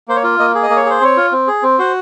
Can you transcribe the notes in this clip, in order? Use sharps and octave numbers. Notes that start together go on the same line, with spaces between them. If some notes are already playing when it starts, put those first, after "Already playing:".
A#3 C5
C#5
F4
A#3 D#5
G#4
D#5
A#3
C#5
G#4 C5
C4 C#5
F4
C4
G#4
C4
F#4 C5